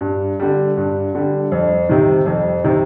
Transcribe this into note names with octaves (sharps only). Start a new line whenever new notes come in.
G2
D3 G3
G2
D3 G3
F2
C3 D#3
F2
C3 D#3